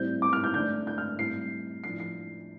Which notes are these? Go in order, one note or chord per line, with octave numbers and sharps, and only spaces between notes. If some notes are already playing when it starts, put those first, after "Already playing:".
Already playing: A2 G3 C4 G6
D6
F6
G6
D3 A3 D4 G6
G6
F6
A2 G3 C4 C7
A2 F3 D4 C7
C7